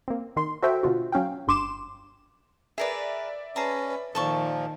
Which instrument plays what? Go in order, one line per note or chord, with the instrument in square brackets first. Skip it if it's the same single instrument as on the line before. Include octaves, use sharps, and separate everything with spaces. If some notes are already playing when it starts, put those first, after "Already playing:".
[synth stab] A#3 C4
D#3 C6
F#4 A4 C5 E5 G5
B2 D3 F4 F#4
F#3 C#4 F5 G5
G1 G2 C6 D6 E7
[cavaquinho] G#4 A#4 B4 [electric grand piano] D5 E5
[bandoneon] C#4 [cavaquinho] G#4 A5 A#5 [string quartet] B4
[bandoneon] A#2 F3 [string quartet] D#3 [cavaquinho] A4 A5 C#6